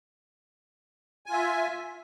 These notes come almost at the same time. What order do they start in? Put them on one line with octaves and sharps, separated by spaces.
G#5 F4 E5